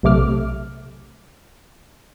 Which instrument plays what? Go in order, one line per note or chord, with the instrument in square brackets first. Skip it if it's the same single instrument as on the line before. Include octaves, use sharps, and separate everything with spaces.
[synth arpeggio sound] B1 C3 A3 D6 F6